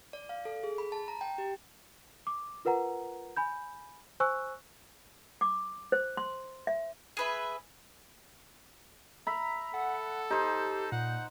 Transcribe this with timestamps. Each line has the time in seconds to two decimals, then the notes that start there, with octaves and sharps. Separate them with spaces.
0.13 D5
0.29 F5
0.45 A4
0.63 G#4
0.78 B5
0.92 A5
1.08 A#5
1.21 G5
1.38 G4
2.27 D6
2.65 F4 A#4 B4 F#5 A#5
3.37 G#5 B5 G6
4.20 C5 G#5 C#6 E6 F#6
5.41 D6
5.92 C5
6.17 C6
6.67 E5
7.17 G#4 B4 E5
9.27 E5 A#5 B5
9.74 A4 F#5
10.30 D#4 G4 C5
10.92 A#2 F#5